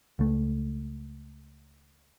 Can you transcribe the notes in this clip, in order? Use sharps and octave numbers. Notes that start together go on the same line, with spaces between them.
C#2 A3